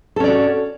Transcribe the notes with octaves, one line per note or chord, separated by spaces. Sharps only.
C#4 F#4 A4 D5